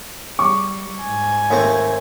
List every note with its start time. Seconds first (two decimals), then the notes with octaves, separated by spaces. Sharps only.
0.39 G3 C#6 D6
1.03 G#2 G#5
1.50 D#2 A3 C4